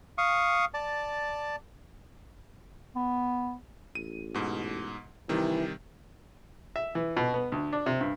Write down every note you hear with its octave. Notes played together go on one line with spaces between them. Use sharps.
F5 C#6 D#6
D5 A5
B3
A1 D#7
G#2 B2
C3 D#3 E3 G3
E5
E3
B2
B3
D2
D4
C3
G2